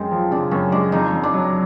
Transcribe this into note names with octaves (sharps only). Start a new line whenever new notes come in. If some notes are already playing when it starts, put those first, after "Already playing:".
Already playing: F#2 G#3 C4
F3
C#3 D4
F#2 C#4
G#3 D4
F2 D#4
F2
D4
F#3